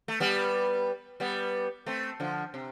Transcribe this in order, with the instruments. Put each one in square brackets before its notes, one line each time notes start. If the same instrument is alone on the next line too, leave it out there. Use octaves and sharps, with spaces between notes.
[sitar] A3
G3 B3
G3 B3
A3 C4
D3 F3
C3